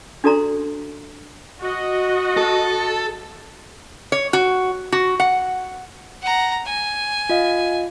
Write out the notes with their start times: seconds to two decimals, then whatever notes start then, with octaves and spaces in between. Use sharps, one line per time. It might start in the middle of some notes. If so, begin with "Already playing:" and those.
0.24 D4 F#4 A4 D5 A#5 C6
1.61 F#4 D#5
2.37 A4
4.12 C#5
4.33 F#4
4.92 F#4
5.20 F#5
6.22 F#5 A#5
6.65 G#5
7.29 F4 D#5 F5